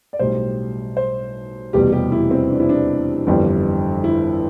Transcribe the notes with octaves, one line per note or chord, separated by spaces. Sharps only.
D5
B1 A2 G3 C5
C5
F1 E2 B2 G3 G4
G4
E4
C4
D4
E4
D4
G1 F2 E3 G3
E4